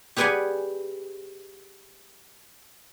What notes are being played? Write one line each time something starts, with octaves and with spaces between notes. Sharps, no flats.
G4 G#4 B4 D5 F#5 G#5